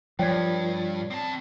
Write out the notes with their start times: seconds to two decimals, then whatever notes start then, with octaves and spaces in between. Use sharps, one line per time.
0.19 G2 F3 C#5 D5 G5 G#6
1.11 C4 A5